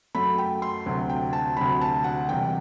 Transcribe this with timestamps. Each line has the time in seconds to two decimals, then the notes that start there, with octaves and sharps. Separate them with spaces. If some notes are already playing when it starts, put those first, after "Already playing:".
0.15 F#2 F#3 A3 B5
0.38 G5
0.62 C6
0.86 D2 C3 F#3
1.09 G5
1.33 A5
1.57 D2 C3 F#3 B5
1.81 A5
2.04 F#5
2.29 E1 E2 C3 G3 G5